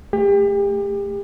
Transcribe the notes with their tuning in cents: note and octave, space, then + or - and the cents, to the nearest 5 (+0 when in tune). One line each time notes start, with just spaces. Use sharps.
A3 +0 G4 +35